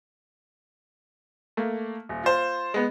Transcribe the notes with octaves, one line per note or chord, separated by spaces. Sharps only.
A3 A#3
D#1
F4 C5
G#3 B3